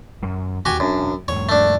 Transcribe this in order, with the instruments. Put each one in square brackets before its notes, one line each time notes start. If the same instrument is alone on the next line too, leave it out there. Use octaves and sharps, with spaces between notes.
[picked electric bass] F#2
[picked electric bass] E1 D#2 [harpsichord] F#4 G4 G#5
[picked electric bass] E1 D4 [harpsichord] F#2
[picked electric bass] E2 G#2 [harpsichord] C#5
[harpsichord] A3 D4